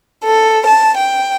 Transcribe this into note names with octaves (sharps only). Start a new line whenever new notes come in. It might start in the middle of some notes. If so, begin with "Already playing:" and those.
A4
A5
G5